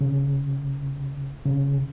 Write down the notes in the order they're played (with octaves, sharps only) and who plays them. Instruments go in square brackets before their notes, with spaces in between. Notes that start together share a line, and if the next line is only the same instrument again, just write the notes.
[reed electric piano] C#3
C#3